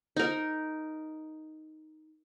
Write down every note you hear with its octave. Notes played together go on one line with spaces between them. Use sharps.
D#4 A#4